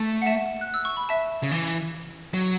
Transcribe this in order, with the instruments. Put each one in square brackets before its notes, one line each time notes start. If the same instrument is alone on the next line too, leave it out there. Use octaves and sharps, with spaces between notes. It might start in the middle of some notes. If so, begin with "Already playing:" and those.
Already playing: [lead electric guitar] A3
[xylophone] F#5
E5 A5
F#6
E6
C#6
B5
E5 A5
[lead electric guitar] C#3
E3
F#3